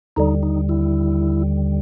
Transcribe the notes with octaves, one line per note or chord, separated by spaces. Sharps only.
D#2 D3 G3 D#4
D#4
E4